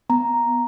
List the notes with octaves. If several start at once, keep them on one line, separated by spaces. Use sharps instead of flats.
B3 A#5